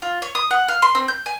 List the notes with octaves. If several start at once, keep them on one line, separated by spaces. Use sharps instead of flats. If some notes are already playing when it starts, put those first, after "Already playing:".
F4
C#5
D#6
F#5
F5
C6
C4
G6
G#5